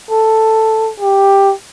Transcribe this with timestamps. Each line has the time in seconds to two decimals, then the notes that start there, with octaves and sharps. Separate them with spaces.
0.11 A4
1.00 G4